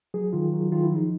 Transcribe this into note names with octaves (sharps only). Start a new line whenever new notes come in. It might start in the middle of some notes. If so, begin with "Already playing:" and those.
F#3 G#4
D#3 F4
F#3
D#3 F4
E4
F3 D#4